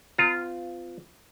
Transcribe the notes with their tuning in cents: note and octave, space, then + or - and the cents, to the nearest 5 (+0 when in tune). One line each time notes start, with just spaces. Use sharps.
C4 -45 F4 +0 A#5 -25